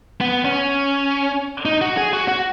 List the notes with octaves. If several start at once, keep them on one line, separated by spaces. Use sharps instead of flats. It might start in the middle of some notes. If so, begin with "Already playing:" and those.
B3
C#4
D#4
F#4
G#4
F#4
F#4